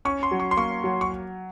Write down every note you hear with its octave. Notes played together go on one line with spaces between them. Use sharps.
C#4 C#6
C6
F#3
C#6
C6
A#3 C#6
F#3
C#6